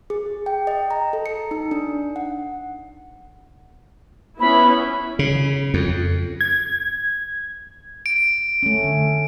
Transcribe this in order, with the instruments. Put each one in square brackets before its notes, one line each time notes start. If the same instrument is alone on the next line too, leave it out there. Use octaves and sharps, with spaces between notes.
[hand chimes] G#4
G5
D#5
A#5
A4
C#7
D#4
D4
F#5
[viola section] B3 C#4 E4 [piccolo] B5
[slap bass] C#3
F2
[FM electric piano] G#6
[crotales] D7
[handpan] A3 C#4
D3